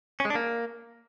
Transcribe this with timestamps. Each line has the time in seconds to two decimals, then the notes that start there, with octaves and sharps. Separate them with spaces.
0.20 C#4
0.25 G#3
0.30 D4
0.35 A#3